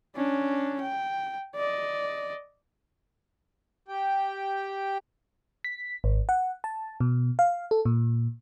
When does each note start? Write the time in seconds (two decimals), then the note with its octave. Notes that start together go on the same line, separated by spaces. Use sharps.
0.16 C#4 D4
0.80 G5
1.56 D5 D#5
3.88 G4 G5
5.64 B6
6.04 G#1
6.29 F#5
6.64 A5
7.00 B2
7.39 F5
7.71 A4
7.85 A#2